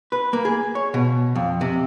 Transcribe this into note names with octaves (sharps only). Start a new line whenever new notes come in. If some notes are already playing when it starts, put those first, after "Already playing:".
B4
A#3
G#4
C#5
B2
F2
C3